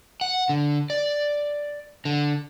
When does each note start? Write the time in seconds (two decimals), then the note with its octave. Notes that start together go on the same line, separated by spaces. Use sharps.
0.21 F#5
0.49 D3
0.90 D5
2.05 D3